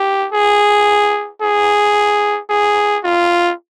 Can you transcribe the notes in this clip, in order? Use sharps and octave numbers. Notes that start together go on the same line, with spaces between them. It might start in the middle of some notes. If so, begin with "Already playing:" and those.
Already playing: G4
G#4
G#4
G#4
F4